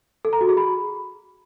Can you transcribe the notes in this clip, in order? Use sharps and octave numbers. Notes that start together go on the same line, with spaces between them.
A4
A#5
F#4
G#4
B5